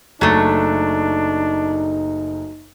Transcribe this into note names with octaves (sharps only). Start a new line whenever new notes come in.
F#1 F#3 A3 D4 D#4 A4